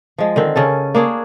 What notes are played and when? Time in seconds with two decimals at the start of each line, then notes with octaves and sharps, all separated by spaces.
0.18 F3 G#3
0.36 D3 D#3 C4
0.56 C#3 C#4 A4
0.95 A#3 D4 G#4 C#5